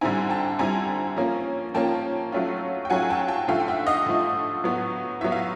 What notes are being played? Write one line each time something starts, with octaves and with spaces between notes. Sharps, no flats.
D3 G3 C4 E4 G#5 A#5
G5 A5
D3 G3 C4 E4 G#5 A#5
F3 A#3 C#4
F3 A#3 C#4 G5 A5
F#3 A3 C#4 F4
G5
F#3 A3 C#4 F4 F#5 G#5
G5 A5
G5 A5
D3 F3 A3 F5 G5
G5
E5 F#5
D#5 F5
D3 F3 A3
A2 F#3 B3
A2 F#3 B3 E5
F5